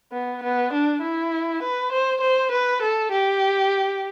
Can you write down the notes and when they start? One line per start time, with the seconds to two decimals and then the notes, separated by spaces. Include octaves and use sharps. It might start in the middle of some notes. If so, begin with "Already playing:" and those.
0.13 B3
0.43 B3
0.73 D4
1.02 E4
1.63 B4
1.92 C5
2.21 C5
2.52 B4
2.82 A4
3.12 G4